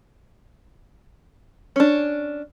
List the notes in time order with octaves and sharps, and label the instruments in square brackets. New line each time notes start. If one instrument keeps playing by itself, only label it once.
[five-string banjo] C#4 D4